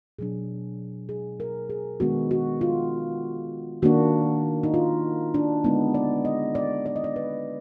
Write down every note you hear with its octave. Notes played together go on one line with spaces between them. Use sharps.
B2 F#3 D4 G#4
G#4
A#4
G#4
D#3 G#3 B3 D4 F#4
F#4
F4
D#3 A#3 D4 F#4
D#4
F4
D4
D3 G#3 B3 D#4
D5
D#5
D5
D5
D#5
D5
B4